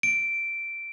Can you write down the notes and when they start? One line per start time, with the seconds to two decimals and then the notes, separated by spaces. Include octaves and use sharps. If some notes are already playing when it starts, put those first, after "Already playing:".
0.03 D7